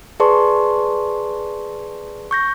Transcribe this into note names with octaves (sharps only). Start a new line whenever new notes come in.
G#4 B4 D5 A5 C6 C#6
C#6 G6 A#6